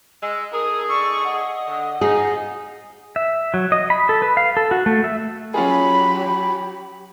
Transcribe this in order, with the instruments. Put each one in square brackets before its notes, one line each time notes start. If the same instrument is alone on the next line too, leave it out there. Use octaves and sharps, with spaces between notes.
[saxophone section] G#3 [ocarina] E6
[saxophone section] A3 D#4 G#4 [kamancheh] A#4 [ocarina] D#6
[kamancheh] D5 C#6 [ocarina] E6
[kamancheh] D#5 [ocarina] F#5
[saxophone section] D3
[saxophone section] F3 D#4 [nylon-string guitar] G#4
[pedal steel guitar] E5
F#3
D#5
B5
A4
B4
F5
A4
F#4
A3
E5
[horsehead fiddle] F#3 G4 [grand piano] C#4 F4 G#4 [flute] B5